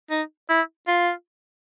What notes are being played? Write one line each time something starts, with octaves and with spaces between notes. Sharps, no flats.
D#4
E4
F4